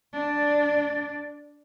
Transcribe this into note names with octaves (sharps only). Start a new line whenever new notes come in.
D4 D5